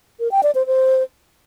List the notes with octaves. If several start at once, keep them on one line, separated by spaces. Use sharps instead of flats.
A#4
G5
D5
C5
C5